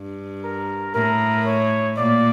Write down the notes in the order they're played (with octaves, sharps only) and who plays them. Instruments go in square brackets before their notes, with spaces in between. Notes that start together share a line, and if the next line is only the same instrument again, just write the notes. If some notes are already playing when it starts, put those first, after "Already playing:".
Already playing: [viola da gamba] G2
[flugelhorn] A#4
[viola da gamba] A2 [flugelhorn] A#4
[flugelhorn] C#5
[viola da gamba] A#2 [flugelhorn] D5